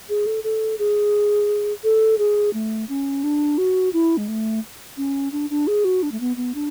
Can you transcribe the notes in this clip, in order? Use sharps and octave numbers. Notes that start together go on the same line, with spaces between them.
G#4
A4
A4
G#4
A4
G#4
A3
C#4
D4
F#4
E4
G#3
A3
C#4
D4
D4
G#4
F#4
D4
A3
B3
B3
D4